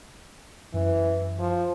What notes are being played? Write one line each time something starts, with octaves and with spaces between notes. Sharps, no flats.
F#2 E3
F3